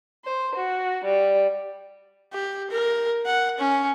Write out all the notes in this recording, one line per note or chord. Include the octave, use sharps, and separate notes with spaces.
C5
F#4
G3
G4
A#4
F#5
C#4